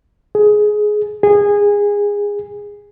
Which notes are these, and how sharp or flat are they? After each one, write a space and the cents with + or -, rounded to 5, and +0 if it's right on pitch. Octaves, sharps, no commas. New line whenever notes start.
G#4 +15
G#4 -20